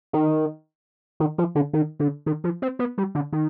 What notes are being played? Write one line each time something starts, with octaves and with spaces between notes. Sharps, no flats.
D#3
D#3
F3
D3
D#3
D3
D#3
F3
C4
B3
G3
D3
D#3